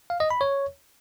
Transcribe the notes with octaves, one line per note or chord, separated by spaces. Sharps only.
F5
D#5
B5
C#5